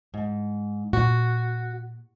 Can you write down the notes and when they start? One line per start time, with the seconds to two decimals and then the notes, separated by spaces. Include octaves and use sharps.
0.14 G#2
0.93 A#2 F#4